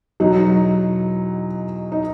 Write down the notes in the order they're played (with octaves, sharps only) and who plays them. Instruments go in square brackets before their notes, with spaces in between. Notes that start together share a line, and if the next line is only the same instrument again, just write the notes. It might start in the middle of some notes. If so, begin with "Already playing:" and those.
[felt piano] E2 B2 F#3 D#4
D#4